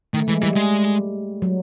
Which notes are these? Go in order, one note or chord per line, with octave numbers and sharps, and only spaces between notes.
D#3 A3
E3 G#3
E3 G3
G#3
F#3